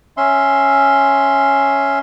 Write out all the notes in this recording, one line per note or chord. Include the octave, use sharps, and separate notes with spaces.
C#4 E5 C6